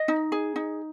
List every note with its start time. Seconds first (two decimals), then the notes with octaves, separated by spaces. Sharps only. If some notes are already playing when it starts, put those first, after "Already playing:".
Already playing: D#5
0.08 D#4
0.32 G#4
0.56 D#4